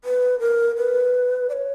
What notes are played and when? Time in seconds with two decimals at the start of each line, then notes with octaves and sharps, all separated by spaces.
0.04 B4
0.40 A#4
0.76 B4
1.49 D5
1.53 C#5